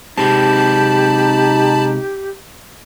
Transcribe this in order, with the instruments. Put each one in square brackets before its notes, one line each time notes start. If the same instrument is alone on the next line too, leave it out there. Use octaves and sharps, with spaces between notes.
[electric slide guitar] C3 G#3 C4 [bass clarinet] D#4 [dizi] G4 [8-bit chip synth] A5 B5